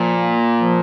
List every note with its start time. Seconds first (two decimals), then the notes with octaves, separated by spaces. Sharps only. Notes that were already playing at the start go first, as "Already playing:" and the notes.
Already playing: A#2 F3
0.12 A#3
0.58 F3